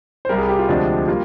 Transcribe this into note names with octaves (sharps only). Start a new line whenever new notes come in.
C5
C2 C3 G3 A#4
G#4
G4
F4
D2 C3 F3 G#3 D4 G4
G3 A#3 F4